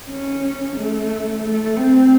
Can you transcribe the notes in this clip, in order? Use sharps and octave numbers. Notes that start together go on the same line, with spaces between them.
C#4
A3
A3
C4